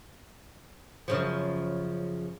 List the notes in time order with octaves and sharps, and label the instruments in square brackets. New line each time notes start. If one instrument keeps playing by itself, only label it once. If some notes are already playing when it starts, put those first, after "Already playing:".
[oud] F#2 C#3 F3